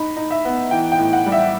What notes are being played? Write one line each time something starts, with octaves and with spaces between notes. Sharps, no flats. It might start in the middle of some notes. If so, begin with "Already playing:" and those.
Already playing: D#4 B5
D#4
E5
B3
E3 G5
G5
A2
F#5
G3
E5